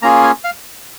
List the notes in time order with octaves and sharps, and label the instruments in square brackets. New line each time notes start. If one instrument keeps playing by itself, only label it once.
[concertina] A#3 C#4 F4 G#4 A#5
G#5
F5